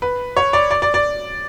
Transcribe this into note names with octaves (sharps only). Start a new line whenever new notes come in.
B4
C#5
D5
D5
D5
D5